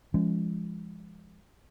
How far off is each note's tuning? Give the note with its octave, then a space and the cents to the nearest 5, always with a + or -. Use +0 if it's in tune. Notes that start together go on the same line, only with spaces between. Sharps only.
F3 -40 G#3 -25 C#4 +0